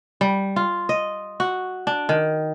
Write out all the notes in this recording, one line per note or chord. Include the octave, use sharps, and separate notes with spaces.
G3
F4
D#5
F#4
D4
D#3